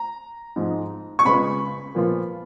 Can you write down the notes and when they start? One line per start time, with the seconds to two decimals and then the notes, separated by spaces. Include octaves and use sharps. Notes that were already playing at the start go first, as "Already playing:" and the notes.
Already playing: A#5
0.56 G#2 F3 G#3
1.19 C#6
1.25 C#3 G#3 B3 F4 B5
1.95 A#2 F3 B3 F4